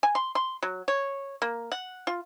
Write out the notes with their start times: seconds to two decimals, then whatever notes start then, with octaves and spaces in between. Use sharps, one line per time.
0.03 G#5
0.15 C6
0.35 C6
0.62 F#3
0.88 C#5
1.42 A#3
1.72 F#5
2.07 F4